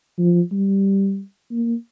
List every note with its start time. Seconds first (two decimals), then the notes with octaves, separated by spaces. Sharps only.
0.18 F3
0.52 G3
1.52 A#3